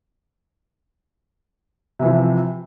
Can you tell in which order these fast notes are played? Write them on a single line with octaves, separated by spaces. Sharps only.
C3 E3 F3